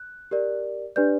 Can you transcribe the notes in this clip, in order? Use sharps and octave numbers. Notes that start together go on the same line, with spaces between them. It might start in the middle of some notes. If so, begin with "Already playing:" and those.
Already playing: F#6
G4 A#4 D5
D4 G4 B4 D5 G6